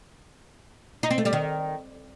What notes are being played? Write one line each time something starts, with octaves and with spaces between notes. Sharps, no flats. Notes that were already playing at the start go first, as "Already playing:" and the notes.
D#4
C4
A3
G3
D#3